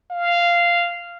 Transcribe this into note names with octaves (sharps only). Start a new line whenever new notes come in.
F5